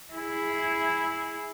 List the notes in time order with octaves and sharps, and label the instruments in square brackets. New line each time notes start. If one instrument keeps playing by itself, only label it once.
[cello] E4 G#4